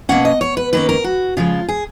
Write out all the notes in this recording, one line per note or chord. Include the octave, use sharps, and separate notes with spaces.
B2 A#3 C#4 F#5
D#5
C#5
B4
D#3 A#3 C#4 B4
A#4
F#4
C#3 F3 G#3 F4
G#4